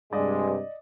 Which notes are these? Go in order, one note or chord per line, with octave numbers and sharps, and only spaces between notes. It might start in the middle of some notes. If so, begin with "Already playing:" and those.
G2 C3 G#3 D5 D#5